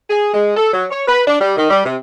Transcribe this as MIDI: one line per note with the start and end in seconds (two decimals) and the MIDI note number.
0.09 0.33 68
0.33 0.52 56
0.56 0.70 69
0.72 0.84 54
0.90 1.02 73
1.06 1.21 71
1.27 1.36 62
1.40 1.54 55
1.57 1.67 51
1.70 1.84 55
1.85 1.96 48